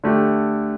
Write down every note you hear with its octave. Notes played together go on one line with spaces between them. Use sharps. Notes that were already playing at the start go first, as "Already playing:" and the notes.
D3 A3 G4